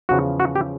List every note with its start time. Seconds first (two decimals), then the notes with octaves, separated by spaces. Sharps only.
0.09 E2 C#3 F3 F#4
0.40 F#4
0.55 G4